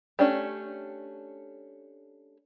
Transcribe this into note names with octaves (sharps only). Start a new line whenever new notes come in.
A3 C#4 D4 G4